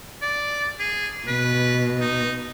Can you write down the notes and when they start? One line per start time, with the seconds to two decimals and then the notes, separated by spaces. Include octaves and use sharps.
0.22 D5
0.79 G#4
1.28 B2 B4
2.00 D#4